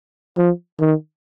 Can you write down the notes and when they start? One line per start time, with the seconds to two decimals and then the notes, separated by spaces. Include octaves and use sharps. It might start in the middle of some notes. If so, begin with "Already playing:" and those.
0.38 F3
0.80 D#3